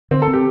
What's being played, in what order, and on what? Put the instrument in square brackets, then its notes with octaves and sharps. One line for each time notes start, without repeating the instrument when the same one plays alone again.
[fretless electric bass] D3 [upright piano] C4
[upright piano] A4
[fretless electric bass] C4
[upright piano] G4